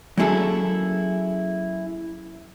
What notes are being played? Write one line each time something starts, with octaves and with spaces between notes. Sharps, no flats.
F#3 A#3 C#4 E4 G#4 A4